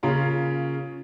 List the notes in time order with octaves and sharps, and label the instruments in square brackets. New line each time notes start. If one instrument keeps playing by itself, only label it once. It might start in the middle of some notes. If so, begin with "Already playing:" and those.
[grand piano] C#3 A#3 C#4 F4 A#5